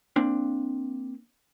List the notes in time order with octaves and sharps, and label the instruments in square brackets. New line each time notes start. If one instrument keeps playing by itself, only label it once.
[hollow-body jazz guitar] A#3 C4 D4